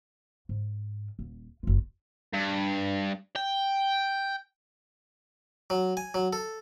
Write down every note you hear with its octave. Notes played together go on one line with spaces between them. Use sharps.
G#2
D#1
F#1 F4
G2
G5
F#3
G#5
F#3
A4